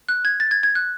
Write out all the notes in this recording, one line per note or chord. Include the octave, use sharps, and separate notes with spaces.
F#6
G#6
A6
G#6
G#6
F#6